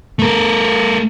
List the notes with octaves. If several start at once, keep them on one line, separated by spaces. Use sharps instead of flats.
A3 A#4